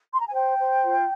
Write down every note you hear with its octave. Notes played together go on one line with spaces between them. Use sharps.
C6
A#5
G#5
C5 G5
C5
F4